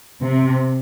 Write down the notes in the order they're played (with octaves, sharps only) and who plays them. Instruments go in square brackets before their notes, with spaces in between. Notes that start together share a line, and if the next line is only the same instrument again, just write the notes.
[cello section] C3